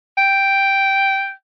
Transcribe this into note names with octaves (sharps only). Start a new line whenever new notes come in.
G5